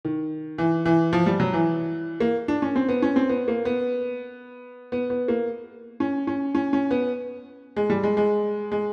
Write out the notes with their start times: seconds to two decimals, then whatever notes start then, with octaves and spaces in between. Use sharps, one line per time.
0.05 D#3
0.58 E3
0.86 E3
1.13 F3
1.26 G3
1.40 F#3
1.53 E3
2.20 A#3
2.48 D4
2.62 C#4
2.76 C4
2.89 B3
3.02 C#4
3.16 C4
3.29 B3
3.48 A#3
3.65 B3
4.92 B3
5.10 B3
5.28 A#3
6.00 C#4
6.27 C#4
6.55 C#4
6.73 C#4
6.91 B3
7.76 G#3
7.90 G3
8.03 G#3
8.17 G#3
8.72 G#3